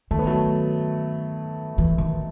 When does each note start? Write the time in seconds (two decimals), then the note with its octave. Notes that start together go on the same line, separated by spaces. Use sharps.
0.11 D#3 A3
0.19 B3
0.27 F#3 A3
1.78 E3
1.98 D#3